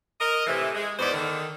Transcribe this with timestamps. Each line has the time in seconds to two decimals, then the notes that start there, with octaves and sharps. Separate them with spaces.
0.21 A#4 D#5
0.47 A2 C3 E3
0.75 G#3
0.99 E2 G#2 B3 C5 D5
1.14 D3 D#3